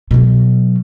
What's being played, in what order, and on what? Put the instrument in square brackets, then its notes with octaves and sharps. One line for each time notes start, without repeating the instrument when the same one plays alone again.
[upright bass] B2 F#3